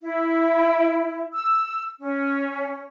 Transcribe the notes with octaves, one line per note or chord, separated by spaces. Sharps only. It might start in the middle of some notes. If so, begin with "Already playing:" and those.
E4
E6
C#4